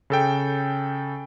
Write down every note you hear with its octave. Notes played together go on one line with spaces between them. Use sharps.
C#3 A4 G5